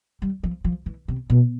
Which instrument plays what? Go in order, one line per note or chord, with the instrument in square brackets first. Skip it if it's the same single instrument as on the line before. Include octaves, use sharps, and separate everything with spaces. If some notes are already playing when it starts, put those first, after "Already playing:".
[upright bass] G3
F3
F3
E3
C3
B2